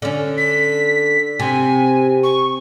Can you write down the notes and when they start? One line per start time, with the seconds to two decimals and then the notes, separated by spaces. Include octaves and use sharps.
0.02 D3 C#4
0.38 B6
1.39 C3 G#5
2.23 C#6